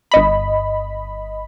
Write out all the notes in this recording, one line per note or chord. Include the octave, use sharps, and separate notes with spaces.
G1 D#5 B5